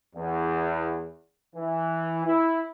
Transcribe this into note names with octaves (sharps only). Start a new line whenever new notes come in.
E2
E3
E4